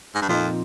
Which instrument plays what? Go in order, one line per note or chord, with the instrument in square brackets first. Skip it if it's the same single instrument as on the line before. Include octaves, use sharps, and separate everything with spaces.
[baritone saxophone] G#2
G2
[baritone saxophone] F2 [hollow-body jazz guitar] A#2 F3 C4 D#4